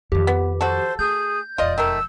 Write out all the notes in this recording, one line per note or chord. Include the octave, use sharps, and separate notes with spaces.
F2 D#3 G4
B3
F#4 A4 C5
A3 G#4 G6
E1 F2 F4 D5 D#5
D#3 A3 A#4 E6